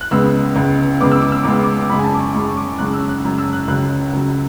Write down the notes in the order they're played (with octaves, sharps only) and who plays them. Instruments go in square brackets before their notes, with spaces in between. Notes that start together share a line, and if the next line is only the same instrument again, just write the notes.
[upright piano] F#6
C#2 C#3 G#3 B3 E6
C#2 C#3 G#3 B3
C#2 C#3 G#3 B3 D6
E6
D6
E6
C#2 C#3 G#3 B3 D6
E6
D6
F#2 C#3 G#3 B5
G#5
A5
D6
C#6
F#2 C#3 G#3 C#6
D6
F#2 C#3 G#3 F#6
E6
F#6
F#2 C#3 G#3
E6
F#6
C#2 C#3 F#3 F#6
C#2 C#3 F#3